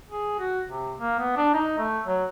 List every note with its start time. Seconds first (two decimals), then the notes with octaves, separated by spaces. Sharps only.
0.09 G#4
0.39 F#4
0.67 C3
0.98 A#3
1.19 B3
1.36 D4
1.54 D#4
1.78 A3
2.07 F#3